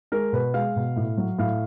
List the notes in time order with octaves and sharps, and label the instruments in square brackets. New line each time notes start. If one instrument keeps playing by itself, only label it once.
[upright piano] G#3 A#4
B2 B4
G#3 F5
B2
A2
F#3
A2 F5